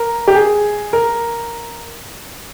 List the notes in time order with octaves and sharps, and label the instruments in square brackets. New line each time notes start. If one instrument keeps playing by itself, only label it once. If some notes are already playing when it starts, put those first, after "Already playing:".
Already playing: [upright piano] A#4
G4
G#4
A#4